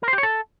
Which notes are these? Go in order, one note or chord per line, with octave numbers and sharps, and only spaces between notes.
A#4
C5
G4
C#5
A4